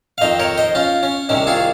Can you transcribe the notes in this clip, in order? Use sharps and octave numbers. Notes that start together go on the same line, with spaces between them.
F5
F2 D#3 C5 D#5
A#4 C#5
C5 D#5
C#4 F4
C#4
C2 C3 D#3 C#4
F4 G#4